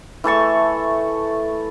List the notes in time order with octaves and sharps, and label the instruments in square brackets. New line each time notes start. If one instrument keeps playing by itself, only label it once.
[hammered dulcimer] E3 A3 A5 C#6